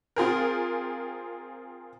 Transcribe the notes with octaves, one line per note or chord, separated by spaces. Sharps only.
C4 F4 G#4 A#4